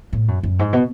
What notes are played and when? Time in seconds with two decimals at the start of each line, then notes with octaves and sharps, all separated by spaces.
0.13 A2
0.28 F#2
0.43 F#2
0.59 G#2
0.73 B2